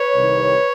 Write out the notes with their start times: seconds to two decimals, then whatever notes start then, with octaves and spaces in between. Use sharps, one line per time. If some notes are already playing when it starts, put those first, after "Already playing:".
Already playing: B4 C#5
0.15 C2 C3 D#3